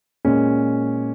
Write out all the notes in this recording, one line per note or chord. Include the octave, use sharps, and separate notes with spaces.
A#2 G#3 C#4